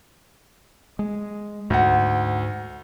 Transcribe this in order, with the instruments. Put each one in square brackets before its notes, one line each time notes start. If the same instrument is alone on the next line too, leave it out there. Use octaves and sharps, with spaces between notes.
[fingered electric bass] G#3
[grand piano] D2 F#5 [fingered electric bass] G#2